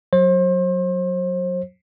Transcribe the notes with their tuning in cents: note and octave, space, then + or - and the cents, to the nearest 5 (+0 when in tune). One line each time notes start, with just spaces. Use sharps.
F#3 -10 C5 +35